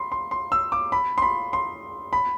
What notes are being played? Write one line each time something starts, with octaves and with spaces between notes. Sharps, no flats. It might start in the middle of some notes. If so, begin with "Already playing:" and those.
Already playing: B5 C6
C6
C6
E6
D6
B5
C6
B5
C6
B5